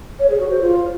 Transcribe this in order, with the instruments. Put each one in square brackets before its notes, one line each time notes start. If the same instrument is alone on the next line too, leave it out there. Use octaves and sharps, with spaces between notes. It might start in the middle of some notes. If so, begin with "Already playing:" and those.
[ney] C#5
G#4
F#4
C5
F4